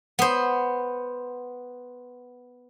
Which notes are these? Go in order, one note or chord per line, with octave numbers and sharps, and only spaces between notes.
B3 C5